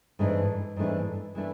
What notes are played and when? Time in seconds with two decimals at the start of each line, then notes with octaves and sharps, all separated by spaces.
0.19 G#2 E3 A3 D4
0.76 G#2 E3 A3 D4
1.35 E3 A3 D4